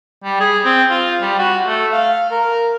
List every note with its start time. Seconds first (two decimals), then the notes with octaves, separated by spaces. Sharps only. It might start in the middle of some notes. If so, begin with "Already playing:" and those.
0.24 G3
0.40 G#4
0.65 C4
0.91 F4
1.22 G3
1.39 F#4
1.67 A3
1.93 F5
2.31 A#4